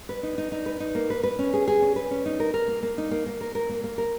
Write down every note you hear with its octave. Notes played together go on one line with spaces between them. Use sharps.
B4
D#4
D#4
D#4
B4
D#4
A#3
B4
B4
C#4
G#4
G#4
C#4
B4
C#4
D#4
A#4
A#4
A#3
A#3
D#4
A#3
A#3
A#4
A#4
A#3
A#3
A#4